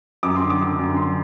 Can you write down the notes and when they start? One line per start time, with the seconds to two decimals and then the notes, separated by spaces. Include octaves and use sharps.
0.23 F#2 D6
0.36 C6
0.42 D3
0.50 D6
0.60 D3
0.79 F#2
0.97 D3 C6